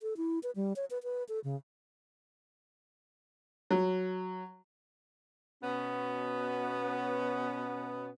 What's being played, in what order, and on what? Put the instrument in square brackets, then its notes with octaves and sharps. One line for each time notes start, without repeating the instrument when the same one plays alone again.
[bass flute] A4
E4
B4
G3
C#5
B4
B4
A4
C#3
[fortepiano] F#3
[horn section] B2 B3 C#4